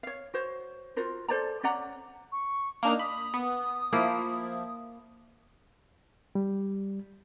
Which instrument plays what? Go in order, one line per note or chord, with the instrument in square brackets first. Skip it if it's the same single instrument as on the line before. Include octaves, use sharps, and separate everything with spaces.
[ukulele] C#5 F5
F#4 C5 C#5
F4 F#4 A#4 C5
A4 C5 D5 A#5
C#4 D5 F#5 A#5
[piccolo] C#6
[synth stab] A#3 D4 D#4 [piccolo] F7
[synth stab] B5 [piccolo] D#6
[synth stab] B3
[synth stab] F3 E4 [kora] A#3
[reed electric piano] G3